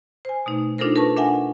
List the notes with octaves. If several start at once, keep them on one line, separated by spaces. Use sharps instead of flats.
C5 G#5
B2 A3 D#4
D4 D#4 F4 A4 A#4 C5
A#4 B4 A5 C#6
D4 A#4 E5 F#5 G#5